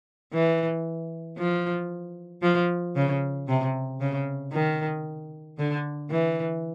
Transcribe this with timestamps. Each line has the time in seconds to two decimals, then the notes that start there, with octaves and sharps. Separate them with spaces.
0.33 E3
1.38 F3
2.42 F3
2.96 C#3
3.48 C3
4.01 C#3
4.52 D#3
5.58 D3
6.10 E3